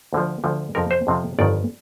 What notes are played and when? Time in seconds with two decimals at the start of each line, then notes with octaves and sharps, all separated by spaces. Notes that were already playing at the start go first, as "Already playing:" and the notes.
0.13 D2 D3 F3
0.44 D2 D3 F3
0.75 F2 C3 F3 A#4
0.91 C5
1.07 F2 C3 F3
1.39 G1 F2 D#3 D5